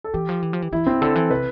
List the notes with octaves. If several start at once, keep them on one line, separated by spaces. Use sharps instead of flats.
A4
E3 G4
F3
E3
F3
E3
E3 E4
B2 C4
D3 A4
E3
C3 B4